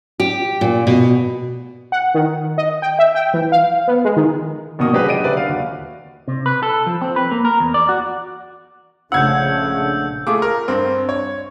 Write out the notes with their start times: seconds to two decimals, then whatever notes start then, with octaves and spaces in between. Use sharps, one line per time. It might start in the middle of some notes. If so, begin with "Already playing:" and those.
0.20 G4
0.61 A#2
0.87 B2
1.92 F#5
2.15 D#3
2.58 D#5
2.82 G5
2.99 E5
3.15 G5
3.34 E3
3.52 F5
3.88 B3
4.05 G#3
4.16 D#3
4.79 A1 B2 D#3 A#3 C#6 D#6
4.93 F#3 D4 G4 G#4 B4
5.06 F#3 G4 D5 D#5 D7 D#7
5.24 D3 B4 D5 E5
5.37 F5
5.49 D#2 F#4
6.28 C3
6.46 B4
6.63 A4
6.86 F3
7.02 C4
7.16 B4
7.32 A#3
7.45 A#4
7.60 E2
7.74 D5
7.89 F#4
9.12 A#1 C#3 A3 D4 F#5 E6 G6 G#6
10.27 A3 F4 G#4 D6
10.42 A#4
10.68 G2 C4
11.09 C#5